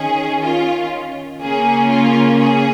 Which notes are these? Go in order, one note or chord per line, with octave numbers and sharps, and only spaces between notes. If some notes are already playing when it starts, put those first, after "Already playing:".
Already playing: D#3 C#4 G#4
F4
C#3 A#3 C#4 G#4
F4
G#4